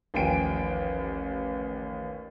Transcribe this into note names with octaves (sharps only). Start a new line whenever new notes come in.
A1 D#2 F3 G5 G#5 D7